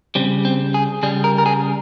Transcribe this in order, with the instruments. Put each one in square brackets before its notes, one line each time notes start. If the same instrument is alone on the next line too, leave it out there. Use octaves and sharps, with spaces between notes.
[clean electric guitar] C#3 G3 C4
C4
G#4
C#3 G3 G#4
A#4
A#4
G#4